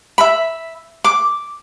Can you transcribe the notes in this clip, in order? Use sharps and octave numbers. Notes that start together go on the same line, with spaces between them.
E5 B5
D6